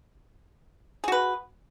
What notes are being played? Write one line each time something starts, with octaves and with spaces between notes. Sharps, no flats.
F#4 G#4 B4